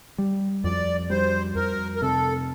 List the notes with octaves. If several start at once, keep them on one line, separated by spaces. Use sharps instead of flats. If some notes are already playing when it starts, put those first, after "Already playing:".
G3
F2 D5
G3 C5
F2 A#4
A#4
C3 A4